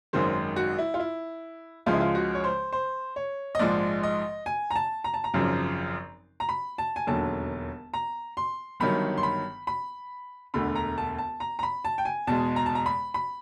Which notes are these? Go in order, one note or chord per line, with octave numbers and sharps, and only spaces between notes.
G#1 F#2 D#3 G#3 C5
F#4
E4
F4
E4
C#2 C#3 F3 G#3 F4
E4
F4
F#4
C#5
C5
C5
C#5
D#5
A#1 G#2 F3 G#3 D5
D#5
G#5
A#5
A5
A#5
A5
A#5
G#1 F#2 C#3 F3
A#5
B5
A5
G#5
E1 D#2 D3 F#3 A5
A#5
C6
G1 G2 D#3 F#3 B5
C6
B5
B5
E1 D2 D3 B5
A#5
A5
A5
A#5
A#5
B5
A5
G5
G#5
E2 B2 G#3 A5
A#5
A5
A#5
B5
B5